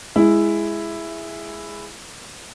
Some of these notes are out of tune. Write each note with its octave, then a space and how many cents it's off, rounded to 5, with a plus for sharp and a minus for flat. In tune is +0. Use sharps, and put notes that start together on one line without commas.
G#3 +0 E4 +5